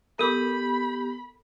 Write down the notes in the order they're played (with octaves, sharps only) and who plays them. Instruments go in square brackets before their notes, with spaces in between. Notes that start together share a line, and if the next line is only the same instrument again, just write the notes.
[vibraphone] B3 G4 [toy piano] A4 A#4 D6 [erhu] B5